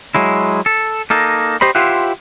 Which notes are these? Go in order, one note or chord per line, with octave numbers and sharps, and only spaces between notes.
F#3 G#3 E4
A4
A#3 D#4 A4
G4 C5 D#5 B5
E4 F4 G4 C5 E5 F#5